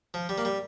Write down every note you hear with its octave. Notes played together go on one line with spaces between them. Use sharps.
F3
G3
A#3
G3